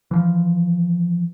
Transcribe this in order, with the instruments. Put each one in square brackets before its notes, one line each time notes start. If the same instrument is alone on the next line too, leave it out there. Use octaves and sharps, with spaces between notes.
[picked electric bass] E3 F3